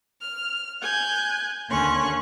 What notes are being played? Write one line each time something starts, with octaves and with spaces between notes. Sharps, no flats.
F6
G#5 F#6 G6
D#2 D3 C#4 C6 C#6 F#6